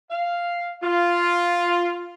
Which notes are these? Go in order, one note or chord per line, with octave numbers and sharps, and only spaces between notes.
F5
F4